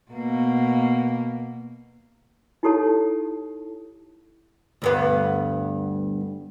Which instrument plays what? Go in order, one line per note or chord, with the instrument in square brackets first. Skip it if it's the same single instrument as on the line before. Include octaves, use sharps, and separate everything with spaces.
[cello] B2 A#3
[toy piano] D#4 E4 G4 A4 C#5 A5
[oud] D2 G2 B3